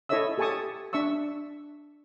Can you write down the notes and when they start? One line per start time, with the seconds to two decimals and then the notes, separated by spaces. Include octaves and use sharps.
0.09 E4 A4 C#5 D#5 E5 E6
0.38 G4 A4 G#5 A5 C#6 D#6
0.93 D4 E5 C#6 E6